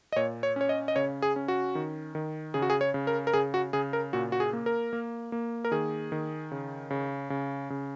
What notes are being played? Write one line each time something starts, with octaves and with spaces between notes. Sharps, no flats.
D#5
A#2 C#5
C#5
C#4 C#5
D#5
D#5
C#3 C#5
G#4
C#4
F#4
D#3
D#3
C#3 G#4
F#4
G#4
C#5
C#3
A#4
A#4
C#3 G#4
F#4
C#3 G#4
A#4
A#2 F#4
F#4
G#4
A#3
A#4
A#3
A#3
A#4
D#3 G#4
D#3
C#3
C#3
C#3
C#3